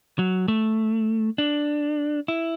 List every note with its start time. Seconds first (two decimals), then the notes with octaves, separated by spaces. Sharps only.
0.19 F#3
0.48 A3
1.38 D4
2.28 E4